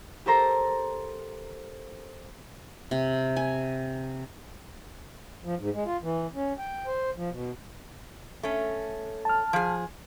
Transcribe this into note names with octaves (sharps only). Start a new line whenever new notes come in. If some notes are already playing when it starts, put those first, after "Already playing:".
G4 A4 A#4 C5 A#5
C3
G#5
F3
G#2
G#3
F4
E3
C#4
G5
C5
F3
B2
A3 C#4
A5 F6
F3 G#4